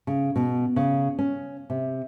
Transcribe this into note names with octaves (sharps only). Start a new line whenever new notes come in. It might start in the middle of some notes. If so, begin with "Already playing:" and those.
C#3
B2
C#3
C#4
C3